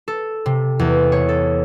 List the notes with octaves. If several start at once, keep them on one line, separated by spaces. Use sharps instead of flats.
A4
C3
E2
C#5
A4